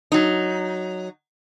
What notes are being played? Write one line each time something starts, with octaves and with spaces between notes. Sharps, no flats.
F#3 D#4